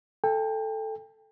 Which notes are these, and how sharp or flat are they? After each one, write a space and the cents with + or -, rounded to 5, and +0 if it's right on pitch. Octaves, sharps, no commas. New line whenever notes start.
A4 +0 G5 +30